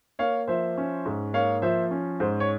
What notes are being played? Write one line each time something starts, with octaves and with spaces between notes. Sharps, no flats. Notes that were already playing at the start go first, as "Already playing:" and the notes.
A#3 C#5 F5
F3 C5 E5
C#4
G#2
A#3 C#5 F5
F3 C5 E5
C#4
G#2 C5
C#5